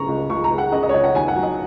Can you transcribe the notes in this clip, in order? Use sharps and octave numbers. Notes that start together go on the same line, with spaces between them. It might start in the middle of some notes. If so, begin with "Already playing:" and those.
Already playing: C#3 G#3 A#5 C#6
C#2
C#2 C#6
A#5
G#3
F#5
C#3 D#5
D#5
C#5
C#2 D#5
F#5
D#2 G#5
F#5
F#3
D#5